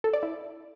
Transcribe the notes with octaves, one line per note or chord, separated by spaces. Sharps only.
A4
D5
E4